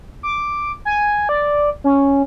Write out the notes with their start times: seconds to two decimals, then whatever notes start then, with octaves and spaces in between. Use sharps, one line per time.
0.23 D6
0.85 G#5
1.29 D5
1.84 C#4